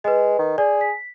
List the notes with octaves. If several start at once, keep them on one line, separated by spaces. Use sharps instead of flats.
G#3 B4 D#5
D#3
G#4 D5
B6